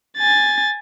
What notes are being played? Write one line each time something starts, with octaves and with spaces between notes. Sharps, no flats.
G#5 A6